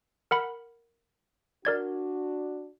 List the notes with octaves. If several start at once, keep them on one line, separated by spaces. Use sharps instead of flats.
A#4 F#5 B5
D4 F#4 A#4 D5 G#6